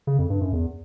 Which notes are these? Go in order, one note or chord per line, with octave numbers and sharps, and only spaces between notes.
C#3
F2
G2
F#2
E2